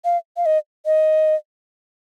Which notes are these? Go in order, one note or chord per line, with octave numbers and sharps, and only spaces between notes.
F5
F5
D#5
D#5